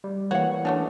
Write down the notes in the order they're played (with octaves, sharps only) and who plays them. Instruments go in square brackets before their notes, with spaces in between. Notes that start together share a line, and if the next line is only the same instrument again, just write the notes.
[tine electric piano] G3
[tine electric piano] E3 A#3 [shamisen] F#4 [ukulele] C#5 F#5
[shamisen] F#3 A3 C#4 [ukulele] D4